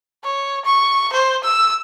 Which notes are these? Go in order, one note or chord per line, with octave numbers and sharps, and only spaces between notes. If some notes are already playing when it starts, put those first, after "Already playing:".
C#5
C#6
C5
E6